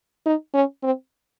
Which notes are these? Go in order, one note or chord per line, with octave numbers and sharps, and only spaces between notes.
D#4
C#4
C4